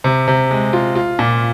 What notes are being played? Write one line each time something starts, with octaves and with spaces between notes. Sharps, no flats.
C3
C3
G#3
F4
F4
A#2